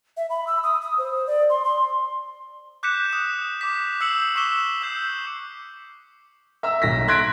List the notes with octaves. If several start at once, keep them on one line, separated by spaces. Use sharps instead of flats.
E5
B5
E6
D#6
D#6
C5
D5
C6
C6
D6 F#6 G6 B6 C#7 E7
D#6 E7
D6 B6
E6 G6 C7 C#7 F#7
C#6 D6 E6 B6 E7 G7
E6 G6 C7
E5 A#5 E6
B1 A#6 B6
C6 F#6 G#6 A#6 B6 D7